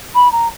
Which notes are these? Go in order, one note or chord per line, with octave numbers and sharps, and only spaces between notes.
B5
A#5